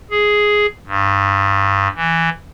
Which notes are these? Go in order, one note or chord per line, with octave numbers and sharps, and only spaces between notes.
G#4
G2
E3